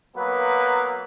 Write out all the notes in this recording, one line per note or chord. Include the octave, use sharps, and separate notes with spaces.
F#3 A#3 B3 B4